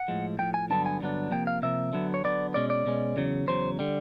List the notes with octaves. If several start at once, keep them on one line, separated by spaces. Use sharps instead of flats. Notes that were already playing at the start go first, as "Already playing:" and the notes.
Already playing: F#5
A2 F3 G#3
A2 F3 G#3 G5
G#5
G2 D3 F#3 B3 D4 A5
G#5
G2 D3 F#3 B3 D4
C3 F3 A#3 G5
F5
C3 F3 A#3 E5
D3 F#3 B3
C#5
D3 F#3 B3 D5
B2 G#3 C#4 D5
D5
B2 G#3 C#4
E2 C#3 F#3
E2 C#3 F#3 C5
D3 G3